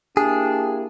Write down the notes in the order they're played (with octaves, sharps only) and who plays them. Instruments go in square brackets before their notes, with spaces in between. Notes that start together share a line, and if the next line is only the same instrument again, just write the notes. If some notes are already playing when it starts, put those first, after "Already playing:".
[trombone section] A#3 E4 G4 [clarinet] D4 [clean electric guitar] G#4